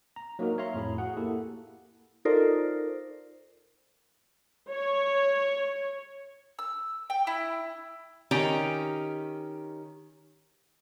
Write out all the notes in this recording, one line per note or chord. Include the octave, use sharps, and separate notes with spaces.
A#5
F#3 A#3 D#4 F#4 A#4
C#5 E5 F5 A#5 C6
F2 A2 G#4 B5
F#4 G#4 F#5
A#3 E4 G4 A4
D#4 F4 A4 A#4 C5 D5
C#5
E6
G5
E4
D#3 C#4 G4 G5 A#5